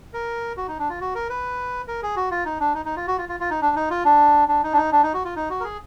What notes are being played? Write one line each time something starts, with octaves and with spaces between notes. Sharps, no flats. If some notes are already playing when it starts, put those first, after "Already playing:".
A#4
F#4
D#4
D4
F4
F#4
A#4
B4
A#4
G#4
F#4
F4
D#4
D4
D#4
D#4
F4
F#4
F4
F4
F4
D#4
D4
D#4
F4
D4
D4
D#4
D4
D#4
D4
D#4
F#4
F4
D#4
F#4
A#4
G#4